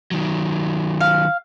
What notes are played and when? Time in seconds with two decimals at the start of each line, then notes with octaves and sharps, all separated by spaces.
0.11 D#3 F#3
1.01 F5